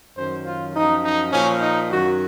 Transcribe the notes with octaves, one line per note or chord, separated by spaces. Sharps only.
F#2 D#3 F#3 C5
F4
F#2 F3 D#4
D#4
A#2 F3 C#4
D#4
F#2 D#3 F#3 F#4